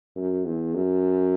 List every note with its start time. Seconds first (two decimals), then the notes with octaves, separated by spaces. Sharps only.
0.16 F#2
0.45 E2
0.75 F#2